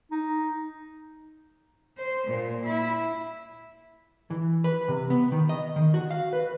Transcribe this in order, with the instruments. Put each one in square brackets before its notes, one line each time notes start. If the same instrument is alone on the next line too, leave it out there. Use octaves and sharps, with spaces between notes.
[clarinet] D#4
[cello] C5
A#2
E4
[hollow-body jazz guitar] E3
B4
C3
B3
D#3
D#5
D#3
F#4
F5
B4